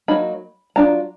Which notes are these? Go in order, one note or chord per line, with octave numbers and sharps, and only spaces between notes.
F#3 A#3 D#4 B5
F#3 A3 D4 F4 A#5